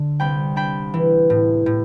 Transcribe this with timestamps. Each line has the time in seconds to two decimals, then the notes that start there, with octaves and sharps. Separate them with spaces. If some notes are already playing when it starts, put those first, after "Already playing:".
Already playing: D3
0.20 C2 G5 B5
0.56 D4 G5 B5
0.94 E3
1.30 A2
1.66 A2